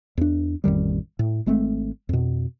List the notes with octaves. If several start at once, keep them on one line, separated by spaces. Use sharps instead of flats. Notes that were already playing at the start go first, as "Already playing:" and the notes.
E2 D4
A1 F2 D#3 G3
A2
G#1 G#3 A3 C4
F2 B2